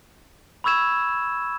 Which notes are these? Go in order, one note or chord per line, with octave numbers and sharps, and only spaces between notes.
B5 C#6 E6 G#6 E7